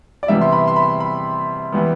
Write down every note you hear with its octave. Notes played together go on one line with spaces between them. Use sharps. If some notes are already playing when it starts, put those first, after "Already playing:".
D5
C3 E3 G3 B3 E5
C6
B5
C6
B5
B5
E3 G3 B3